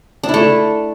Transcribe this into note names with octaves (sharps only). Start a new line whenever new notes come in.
D4
E4
A3